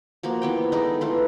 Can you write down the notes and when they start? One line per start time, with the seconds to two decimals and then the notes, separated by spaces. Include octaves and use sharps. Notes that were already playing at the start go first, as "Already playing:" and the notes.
0.23 F3 A#3 F#4
0.42 E3 B3 G5
0.72 G#3 D#4 A4
1.01 E3 A3 F4